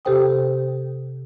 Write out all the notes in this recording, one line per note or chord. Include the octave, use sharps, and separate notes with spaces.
C3 G4 A4 C5 G5 D#6